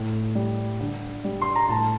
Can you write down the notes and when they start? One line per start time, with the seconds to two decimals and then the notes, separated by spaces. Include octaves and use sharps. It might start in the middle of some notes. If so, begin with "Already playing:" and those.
Already playing: A2
0.35 G3
0.80 D3
1.24 G3
1.42 C6
1.56 A#5
1.69 A2 A5